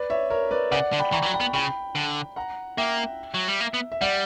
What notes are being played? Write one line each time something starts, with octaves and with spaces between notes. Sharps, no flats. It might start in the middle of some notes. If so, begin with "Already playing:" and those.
Already playing: B4 D5
C#5 E5
A#4 C#5
B4 D5
C#3 D5 F#5
D3
G5 B5
E3 A#5 C#6
E3
F#3
G5 B5
B3
C#3 G5 B5
D3
F#5 A#5
A#3 E5 G5
F#3
G3
A#3
B3
E5
G3 D5 F#5